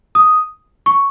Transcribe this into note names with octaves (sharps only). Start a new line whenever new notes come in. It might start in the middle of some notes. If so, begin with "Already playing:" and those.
D#6
C#6